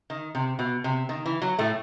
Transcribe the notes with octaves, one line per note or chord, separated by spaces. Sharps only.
D#3
C3
B2
C3
D#3
E3
F#3
A2 A3